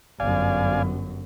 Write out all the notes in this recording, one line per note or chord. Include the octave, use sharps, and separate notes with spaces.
G1 F#2 D5 F5 G#5